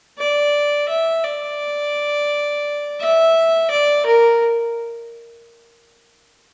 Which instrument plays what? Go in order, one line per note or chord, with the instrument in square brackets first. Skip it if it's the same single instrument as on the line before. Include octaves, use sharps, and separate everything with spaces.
[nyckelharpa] D5
E5
D5
E5
D5
A#4